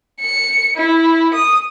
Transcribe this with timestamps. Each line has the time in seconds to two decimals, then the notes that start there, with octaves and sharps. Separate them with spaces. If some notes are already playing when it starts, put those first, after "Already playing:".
0.21 C#7
0.77 E4
1.34 D#6